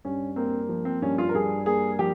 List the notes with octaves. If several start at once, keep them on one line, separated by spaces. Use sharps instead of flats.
G2 C#4
A#3 C4
F3
C4
G2 C#4
F4
A#4
G2 G#4
A#3 G#4
F3 G4